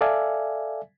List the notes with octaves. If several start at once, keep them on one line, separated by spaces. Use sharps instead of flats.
A4 D5 E5 F5 G#5